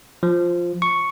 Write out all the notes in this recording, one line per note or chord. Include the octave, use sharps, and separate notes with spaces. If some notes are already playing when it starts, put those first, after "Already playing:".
F3
C#6